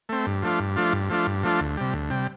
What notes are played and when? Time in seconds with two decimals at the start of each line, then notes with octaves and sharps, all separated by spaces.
0.09 A3 C4
0.26 G2
0.43 F3 A3 D4 F4
0.60 G2
0.76 F3 A3 D4 F4
0.93 G2
1.10 F3 A3 D4 F4
1.27 G2
1.44 F3 A3 D4 F4
1.60 D2
1.77 C3 G3
1.93 D2
2.10 C3 G3